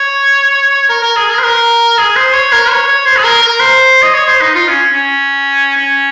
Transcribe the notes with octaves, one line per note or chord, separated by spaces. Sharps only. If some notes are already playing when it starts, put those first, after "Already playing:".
Already playing: C#5
A#4
A#4
G#4
A#4
C5
A#4
G#4
C5
C#5
A#4
C#5
C#5
C5
G#4
A#4
A#4
C5
D#5
C#5
C5
D#4
F4
C#4
C#4
C#4